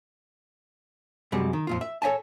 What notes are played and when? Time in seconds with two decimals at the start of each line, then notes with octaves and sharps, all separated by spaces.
1.32 F#2 C3 G3 G#3
1.53 D#3
1.67 F2 A#2 F4
1.81 E5
2.02 A4 C#5 E5 G#5 A5